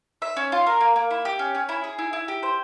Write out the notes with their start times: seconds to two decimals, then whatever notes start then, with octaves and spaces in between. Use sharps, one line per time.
0.22 E5
0.37 C#4
0.52 F4
0.66 A#4
0.81 A#3
0.96 A#3
1.11 E4
1.25 G4
1.39 C#4
1.55 C#4
1.69 E4
1.84 G#4
1.99 E4
2.13 E4
2.28 G4
2.43 C5